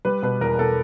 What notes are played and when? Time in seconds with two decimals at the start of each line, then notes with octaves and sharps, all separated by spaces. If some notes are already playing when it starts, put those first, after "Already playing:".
0.05 G3 B4
0.22 B2 B4
0.41 E2 A#4
0.59 B2 A4